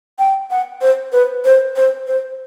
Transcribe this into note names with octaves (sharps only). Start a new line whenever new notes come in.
G5
F#5
C5
B4
C5
C5
C5